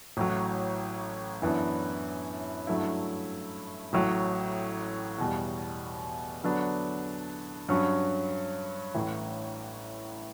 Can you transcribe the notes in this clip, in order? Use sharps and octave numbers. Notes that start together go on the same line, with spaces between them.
A1 A2 F#3
F#2 E3 B3 D4
G2 F#3 A3 E4
A1 A2 F#3
E2 B2 G3
D3 F#3 B3 D4
G2 F#3 C#4
A1 A2 E3